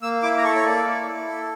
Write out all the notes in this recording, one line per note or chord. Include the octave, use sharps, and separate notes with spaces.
A#3 E6
E4 D6
A#5
A4 C#6
C#5
A#3 D5
E4
E4
A4